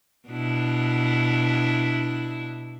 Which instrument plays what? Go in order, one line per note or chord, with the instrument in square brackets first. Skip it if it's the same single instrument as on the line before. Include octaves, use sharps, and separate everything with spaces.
[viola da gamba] B2 D4 E4